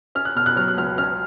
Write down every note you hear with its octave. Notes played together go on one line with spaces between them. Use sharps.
C#4 F6
F#6
B2 F6
F#6
F#3 F6
F#6
C#2 F6
C#4 F6